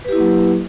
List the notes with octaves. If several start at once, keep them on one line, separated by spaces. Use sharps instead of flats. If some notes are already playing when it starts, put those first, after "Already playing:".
F#3 A#3 E4 G4 B4